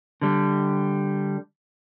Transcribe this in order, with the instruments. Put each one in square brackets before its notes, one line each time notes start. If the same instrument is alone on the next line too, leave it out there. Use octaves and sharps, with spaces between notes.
[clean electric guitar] D3 G3